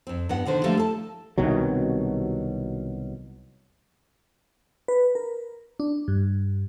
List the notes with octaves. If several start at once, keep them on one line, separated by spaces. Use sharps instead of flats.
F2 C4
G2 B3 F#5
B2 D3 D#3 C5
D3 F3 G3 A3 A#3
A4 A5
C2 B2 D#3 F#3
B4
A#4
D4
G2